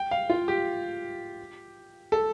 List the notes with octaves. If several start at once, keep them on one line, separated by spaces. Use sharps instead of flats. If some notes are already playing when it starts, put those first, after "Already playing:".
Already playing: G5
F5
F4
G4
A4